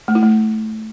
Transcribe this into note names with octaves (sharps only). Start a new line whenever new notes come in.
A3
E4
A3